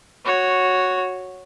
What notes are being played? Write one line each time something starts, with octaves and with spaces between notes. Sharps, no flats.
F#4 C#5